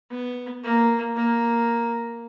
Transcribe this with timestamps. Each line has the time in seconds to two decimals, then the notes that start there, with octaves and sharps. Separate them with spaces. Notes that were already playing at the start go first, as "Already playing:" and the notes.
0.10 B3
0.63 A#3
1.16 A#3